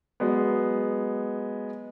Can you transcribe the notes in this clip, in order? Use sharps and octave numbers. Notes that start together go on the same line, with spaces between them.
F#3 G#3 B3